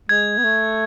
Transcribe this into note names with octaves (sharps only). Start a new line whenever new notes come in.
G#3 G#6
B3
A3